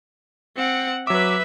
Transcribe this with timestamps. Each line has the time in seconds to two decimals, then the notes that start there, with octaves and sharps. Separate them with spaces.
0.57 C4 F#5 C#7
1.07 F#3 B4 E5 D6 E6